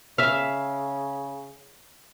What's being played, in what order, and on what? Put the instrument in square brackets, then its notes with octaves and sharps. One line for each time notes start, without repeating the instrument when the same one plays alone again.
[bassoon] C#3 [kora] E5 F5